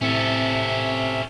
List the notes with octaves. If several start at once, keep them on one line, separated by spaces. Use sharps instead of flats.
A2 C3 C4 C#4 A4 E5 C#7